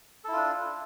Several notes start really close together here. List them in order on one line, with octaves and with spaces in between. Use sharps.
A4 E4 F4 D4